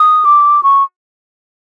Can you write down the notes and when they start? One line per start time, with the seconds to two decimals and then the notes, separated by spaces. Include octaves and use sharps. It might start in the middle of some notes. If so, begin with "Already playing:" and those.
Already playing: D#6
0.25 D6
0.63 C#6